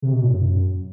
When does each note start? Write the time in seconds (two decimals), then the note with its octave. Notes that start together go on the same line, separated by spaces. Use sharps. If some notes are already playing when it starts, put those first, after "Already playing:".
0.02 C3
0.13 B2
0.23 A2
0.33 F#2